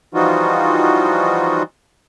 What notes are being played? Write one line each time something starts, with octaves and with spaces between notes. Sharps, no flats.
E3 F3 G3 D#4 F4 F#4